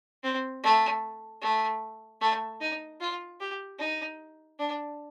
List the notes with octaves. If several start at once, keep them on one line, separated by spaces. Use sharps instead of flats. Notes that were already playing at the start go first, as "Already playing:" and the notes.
C4
A3
A3
A3
D#4
F4
G4
D#4
D4